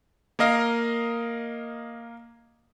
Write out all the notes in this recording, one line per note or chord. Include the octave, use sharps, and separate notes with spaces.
A#3 A#4 D#5 F5